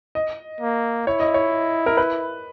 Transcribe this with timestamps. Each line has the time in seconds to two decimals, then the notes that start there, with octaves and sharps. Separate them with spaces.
0.15 D#5
0.61 A#3
1.07 E4 C#5
1.20 D#5
1.34 C#5
1.86 A#4
1.97 B4